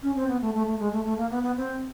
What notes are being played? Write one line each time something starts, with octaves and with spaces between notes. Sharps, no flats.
C#4
C4
B3
A3
A3
A3
G#3
A3
A3
A#3
B3
B3
C4